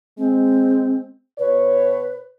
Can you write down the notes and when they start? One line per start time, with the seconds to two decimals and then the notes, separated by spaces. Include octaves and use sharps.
0.18 G#3 C4
1.39 B2 B4 C#5